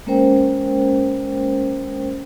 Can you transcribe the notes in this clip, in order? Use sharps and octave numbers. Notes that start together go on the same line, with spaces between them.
G#3 A#3 C#4 A#4 C5 G5